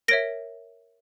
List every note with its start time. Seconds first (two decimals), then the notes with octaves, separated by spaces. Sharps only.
0.08 A#4 C#5 E5 A#6 D7